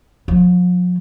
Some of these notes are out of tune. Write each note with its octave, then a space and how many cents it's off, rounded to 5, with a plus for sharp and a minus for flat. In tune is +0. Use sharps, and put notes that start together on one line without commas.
F3 +45